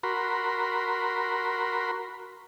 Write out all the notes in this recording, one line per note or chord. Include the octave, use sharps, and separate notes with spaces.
F#4 A#4 B5 C6